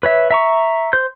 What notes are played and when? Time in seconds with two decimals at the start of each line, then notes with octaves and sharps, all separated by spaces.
0.03 B4 C#5 E5
0.31 E5 A#5 C#6
0.93 C5 G6